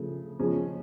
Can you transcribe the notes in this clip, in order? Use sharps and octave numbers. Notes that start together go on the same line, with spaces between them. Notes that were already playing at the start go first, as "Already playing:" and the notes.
Already playing: C#3 F3 A3
C#3 F3 G#3 C#4